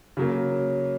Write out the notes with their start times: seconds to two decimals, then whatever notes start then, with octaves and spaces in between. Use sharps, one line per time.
0.17 C#3 F#3 A#3